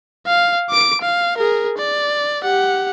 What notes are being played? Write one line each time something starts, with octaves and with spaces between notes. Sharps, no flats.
F5
D6 D7
F5
G#4 A#4
D5
G4 F#5